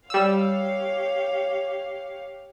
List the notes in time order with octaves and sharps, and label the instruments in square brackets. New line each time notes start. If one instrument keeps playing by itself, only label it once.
[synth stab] G3 E6 [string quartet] G4 C#5 F5